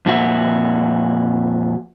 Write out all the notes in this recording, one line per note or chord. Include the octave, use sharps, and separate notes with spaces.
F2 A#2 F#4 E5